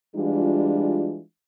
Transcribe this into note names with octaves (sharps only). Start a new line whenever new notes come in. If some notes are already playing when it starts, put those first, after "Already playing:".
E3 G3 G#3 D4 F4